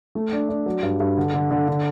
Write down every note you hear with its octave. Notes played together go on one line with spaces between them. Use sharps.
A3
D4
D4
F#3
G2
G2
D3
D3
D3
D3